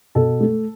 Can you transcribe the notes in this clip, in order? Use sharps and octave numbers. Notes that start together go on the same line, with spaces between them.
B2 A4
A3